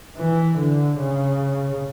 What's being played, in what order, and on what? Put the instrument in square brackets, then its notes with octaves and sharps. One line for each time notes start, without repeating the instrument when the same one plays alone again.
[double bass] E3
D3
C#3